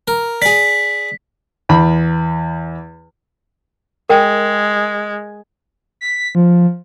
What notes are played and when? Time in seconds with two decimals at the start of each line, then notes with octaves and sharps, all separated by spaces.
0.08 A#4
0.42 G#4 D5 B6
1.69 E2 B5
4.10 G#3 A#4 G5
6.01 B6
6.35 F3